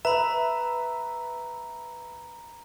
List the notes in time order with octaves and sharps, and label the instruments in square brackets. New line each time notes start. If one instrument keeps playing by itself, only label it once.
[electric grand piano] B4 E5 [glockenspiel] A#5 B5